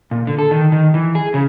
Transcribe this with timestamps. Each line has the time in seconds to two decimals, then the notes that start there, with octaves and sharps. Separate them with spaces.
0.11 A#2
0.27 D3
0.39 A4
0.51 D#3
0.72 D#3
0.94 E3
1.15 G#4
1.34 C#3